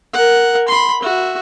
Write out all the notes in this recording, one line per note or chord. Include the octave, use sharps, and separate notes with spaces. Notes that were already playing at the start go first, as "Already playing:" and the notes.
A#4 F#5
B5 C6
F#4 E5